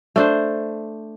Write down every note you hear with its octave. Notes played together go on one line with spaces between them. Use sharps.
A3 D4 C5